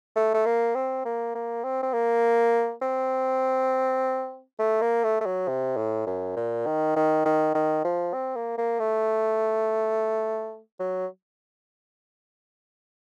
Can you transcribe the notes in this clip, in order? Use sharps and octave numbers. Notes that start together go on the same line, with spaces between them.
A3
A3
A#3
C4
A#3
A#3
C4
C4
A#3
C4
A3
A#3
A3
A3
F#3
C3
A2
F#2
A#2
D#3
D#3
D#3
D#3
F3
C4
A#3
A#3
A3
F#3